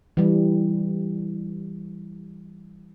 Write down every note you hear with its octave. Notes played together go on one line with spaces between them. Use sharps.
E3 G3